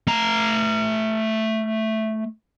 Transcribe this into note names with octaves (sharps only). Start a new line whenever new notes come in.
A3 A#5